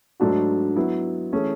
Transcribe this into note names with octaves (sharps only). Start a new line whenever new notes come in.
G#2 F#3 A3 D4 F#4
F#3 B3 E4
E3 A3 C#4 G#4